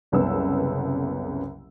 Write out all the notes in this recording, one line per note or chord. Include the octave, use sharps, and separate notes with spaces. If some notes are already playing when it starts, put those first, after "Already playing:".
F#1 C2 C#3 B3 E6